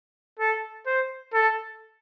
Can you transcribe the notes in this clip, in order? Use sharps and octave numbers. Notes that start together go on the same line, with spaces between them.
A4
C5
A4